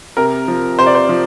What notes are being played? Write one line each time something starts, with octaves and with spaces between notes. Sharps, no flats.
C3 A#4
F3
C3 C5
D5
C5
F3